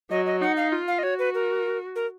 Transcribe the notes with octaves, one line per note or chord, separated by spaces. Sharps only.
F#3 D#5
D#5
D#4 F#5
F5
F4
F5
D#5
F#4 C#5
B4
A#4
A#4